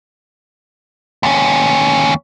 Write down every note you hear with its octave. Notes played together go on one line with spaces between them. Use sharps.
D#2 C#4